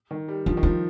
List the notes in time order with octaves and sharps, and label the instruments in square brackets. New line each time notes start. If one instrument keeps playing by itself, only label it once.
[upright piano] D#3
G3
[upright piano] F3 [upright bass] D4
[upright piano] D#3
[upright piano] F3 [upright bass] D4